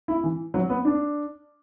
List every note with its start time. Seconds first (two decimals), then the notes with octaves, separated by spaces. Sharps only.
0.08 E4
0.24 E3
0.54 F#3
0.70 B3
0.85 D4